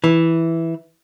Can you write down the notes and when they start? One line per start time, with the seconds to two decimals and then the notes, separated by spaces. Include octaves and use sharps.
0.04 E3